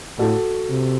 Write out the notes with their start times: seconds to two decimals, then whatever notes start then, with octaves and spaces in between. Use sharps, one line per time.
0.19 A2 F#4 A4
0.69 C3